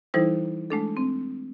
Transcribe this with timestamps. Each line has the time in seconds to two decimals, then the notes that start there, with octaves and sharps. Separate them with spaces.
0.14 E3 G3 D#4 E4 A4 C5
0.70 G#3 A3 D4 A4
0.97 C4